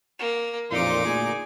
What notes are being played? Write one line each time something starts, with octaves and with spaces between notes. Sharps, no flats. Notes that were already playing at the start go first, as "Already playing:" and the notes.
A#3
A1 F2 A#2 D#4 F4 C6 D6
D2 A#2 G#4 G#5